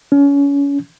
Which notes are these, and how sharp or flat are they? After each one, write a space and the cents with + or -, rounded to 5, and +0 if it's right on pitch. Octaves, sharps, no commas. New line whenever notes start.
C#4 +30